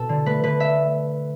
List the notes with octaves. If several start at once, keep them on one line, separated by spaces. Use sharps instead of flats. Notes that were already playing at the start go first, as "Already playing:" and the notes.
Already playing: B2 A4
D3
A3 B4
D3 B4
E5